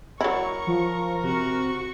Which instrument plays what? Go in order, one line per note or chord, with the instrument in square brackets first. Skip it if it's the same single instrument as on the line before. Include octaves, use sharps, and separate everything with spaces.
[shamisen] F#3 E4 [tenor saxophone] A#4 [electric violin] C#6
[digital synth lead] F3
[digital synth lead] C3 [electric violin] F#4 C#6